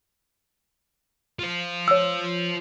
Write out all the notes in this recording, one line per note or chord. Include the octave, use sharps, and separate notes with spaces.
F4 C5
C#5 E6